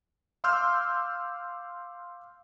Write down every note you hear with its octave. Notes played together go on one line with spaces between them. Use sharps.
F5 C6 D6 E6 F6 G6